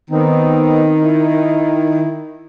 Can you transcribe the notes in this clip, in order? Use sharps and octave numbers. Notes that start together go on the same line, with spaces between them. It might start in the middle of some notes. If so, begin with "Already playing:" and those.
D#3 B3 C4 D#4
E4